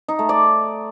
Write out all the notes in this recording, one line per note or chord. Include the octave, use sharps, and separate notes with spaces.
D#4
A3
D5